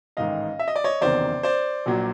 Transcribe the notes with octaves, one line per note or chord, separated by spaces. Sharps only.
A1 G#2 D#3 D#5 F5
E5
D#5
D5
C#5 D#5
F#1 E2 C3 D#3 C5 D5
C5 D5
A#1 A#2 F#3